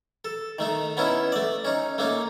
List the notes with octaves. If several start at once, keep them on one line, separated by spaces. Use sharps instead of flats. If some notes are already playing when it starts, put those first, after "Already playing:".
A4
D#3 A3 D#4
B3 C#4 D#4 E4
A3 D5
C#4 D#4
A3 A#3 C#4 D#4